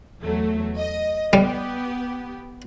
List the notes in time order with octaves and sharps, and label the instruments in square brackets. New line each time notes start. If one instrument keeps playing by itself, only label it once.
[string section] E2 F#3 A3
D#5
[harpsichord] G3 [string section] B3 G4